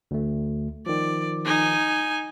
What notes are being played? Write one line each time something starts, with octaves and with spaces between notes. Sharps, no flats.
D2 A3
D#3 F3 D5
D#4 G#5